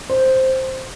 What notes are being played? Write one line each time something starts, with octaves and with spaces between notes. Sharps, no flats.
C5